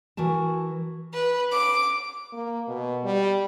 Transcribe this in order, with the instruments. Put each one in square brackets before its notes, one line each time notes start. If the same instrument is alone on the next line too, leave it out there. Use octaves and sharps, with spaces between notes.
[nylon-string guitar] E3 F#4 A#4 A5
[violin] B4
D6
[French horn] A#3
B2
G3